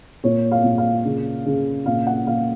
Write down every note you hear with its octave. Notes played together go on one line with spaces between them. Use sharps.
A#2 C#5
F5
A#2
F5
C#3
C#3
A#2 F5
F#5
A#2 F5